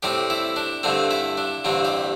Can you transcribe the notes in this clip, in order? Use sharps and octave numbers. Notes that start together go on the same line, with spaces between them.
A2 G3 C4 G4
E4
D4
G2 D3 A3 C4
E4
D4
A1 G2 D3 G3 C4
G4